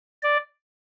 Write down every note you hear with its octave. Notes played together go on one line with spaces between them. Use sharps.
D5